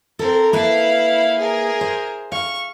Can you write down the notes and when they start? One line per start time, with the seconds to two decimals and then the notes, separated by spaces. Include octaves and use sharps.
0.19 C4 A4 A#4
0.53 A#3 E4 B4 F5 A5
1.38 G#4 A#4
1.81 C5
2.32 F5 C#6